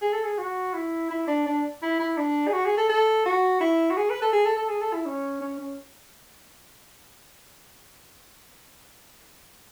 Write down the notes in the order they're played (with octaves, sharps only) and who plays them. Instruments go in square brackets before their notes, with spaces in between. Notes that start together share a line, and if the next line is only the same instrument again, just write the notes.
[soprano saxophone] G#4
A4
G#4
F#4
E4
E4
D4
D4
E4
E4
D4
G#4
F#4
G#4
A4
A4
F#4
E4
F#4
G#4
B4
A4
G#4
A4
A4
G#4
A4
E4
C#4
C#4
C#4